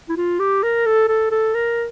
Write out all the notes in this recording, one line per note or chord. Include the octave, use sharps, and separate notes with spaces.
E4
F4
G4
A#4
A4
A4
A4
A#4